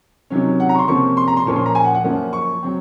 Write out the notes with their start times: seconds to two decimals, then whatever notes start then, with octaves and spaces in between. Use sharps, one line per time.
0.30 C3 D#3 F#3 C#4
0.60 F#5
0.69 A#5
0.75 C#6
0.79 C6
0.88 C3 F3 A#3 C#4 C#6
1.17 C6
1.28 A#5
1.37 C6
1.46 A#2 F3 A#3 C#4 C#6
1.56 C6
1.66 A#5
1.75 G#5
1.84 F#5
1.95 F#5
2.04 F#2 F3 A#3 C#4
2.33 C#6
2.63 F#3 C4